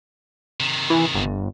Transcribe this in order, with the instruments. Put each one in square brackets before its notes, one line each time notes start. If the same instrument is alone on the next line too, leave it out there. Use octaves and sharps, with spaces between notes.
[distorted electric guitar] C3 D#3
[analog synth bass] E3
G1